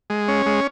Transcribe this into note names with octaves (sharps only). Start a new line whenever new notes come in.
G#3
C#4
G#3